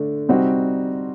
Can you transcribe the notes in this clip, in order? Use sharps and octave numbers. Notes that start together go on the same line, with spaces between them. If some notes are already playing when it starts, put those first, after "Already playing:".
Already playing: D3 A3 D4
C3 G3 C4 D#4 F#4